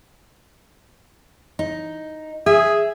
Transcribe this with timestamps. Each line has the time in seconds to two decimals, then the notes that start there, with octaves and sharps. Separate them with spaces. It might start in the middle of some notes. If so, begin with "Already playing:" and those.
1.59 D#4
2.46 G#4 E5